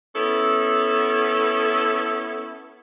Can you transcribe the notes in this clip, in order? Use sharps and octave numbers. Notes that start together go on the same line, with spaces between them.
B3 C#4 E4 A4